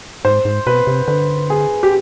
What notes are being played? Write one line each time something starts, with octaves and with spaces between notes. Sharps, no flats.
G#2 C5
G#2
B2 B4
C3
D3 B4
G#4
G4